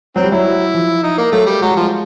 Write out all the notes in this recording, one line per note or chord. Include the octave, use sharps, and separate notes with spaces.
F#3 C4
G3
F#3 E4
F3
D#4
A#3
F#3 A3
G3
F#3 G#3
G3
F3 G#3